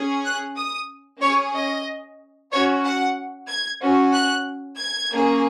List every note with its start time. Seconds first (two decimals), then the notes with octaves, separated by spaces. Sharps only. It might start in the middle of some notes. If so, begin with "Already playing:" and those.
Already playing: C#4 G#4
0.24 F#6
0.57 D#6
1.21 C#4 G#4 C#5
1.54 D#5
2.51 C#4 F#4 C#5
2.84 F#5
3.48 G#6
3.81 C#4 F#4
4.13 F#6
4.78 G#6
5.10 A#3 C#4 G#4